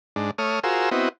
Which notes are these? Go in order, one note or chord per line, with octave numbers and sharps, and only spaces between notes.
G#2 D4
A3 C#5 D#6 F6
F4 F#4 G#4 A#4 C5 E6
B3 C4 E4 F#4 D#5